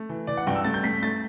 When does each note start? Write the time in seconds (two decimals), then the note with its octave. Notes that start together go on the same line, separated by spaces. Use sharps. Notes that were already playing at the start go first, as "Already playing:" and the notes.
Already playing: A3
0.09 E3
0.27 E3 D5
0.37 F#5
0.47 G2 G5
0.55 E6
0.64 A3 A6
0.74 G6
0.84 A3 B6
1.03 A3 A6